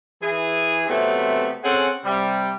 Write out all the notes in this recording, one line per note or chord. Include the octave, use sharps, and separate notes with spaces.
E3 G#4
C3 F#3 A3 B3 C4
C4 C#4 G#4 A4 F#5
C3 G3